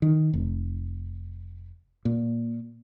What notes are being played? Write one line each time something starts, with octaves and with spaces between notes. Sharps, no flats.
D#3
F1
A#2